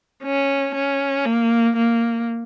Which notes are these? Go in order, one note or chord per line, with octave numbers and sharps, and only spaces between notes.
C#4
C#4
A#3
A#3